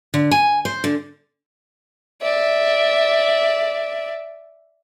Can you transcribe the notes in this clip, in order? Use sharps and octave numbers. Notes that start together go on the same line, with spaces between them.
D3
G#5
C5
D3
D5 E5